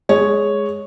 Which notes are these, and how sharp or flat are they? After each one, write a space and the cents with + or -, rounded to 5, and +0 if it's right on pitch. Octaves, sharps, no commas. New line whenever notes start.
G#3 +0 C#5 +0